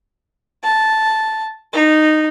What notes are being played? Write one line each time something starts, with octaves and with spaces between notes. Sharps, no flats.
A5
D#4